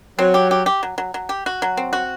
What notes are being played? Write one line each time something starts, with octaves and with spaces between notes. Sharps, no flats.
F#3 C4
G4
G4
G4
F#3
F#3
F#3
G4
F#4
F#3
C4
F#4